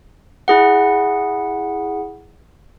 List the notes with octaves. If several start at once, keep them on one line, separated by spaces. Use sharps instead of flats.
E4 G#4 F#5